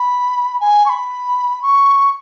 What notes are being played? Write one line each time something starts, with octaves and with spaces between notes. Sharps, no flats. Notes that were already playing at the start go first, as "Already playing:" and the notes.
Already playing: B5
G#5
C#6
B5
C#6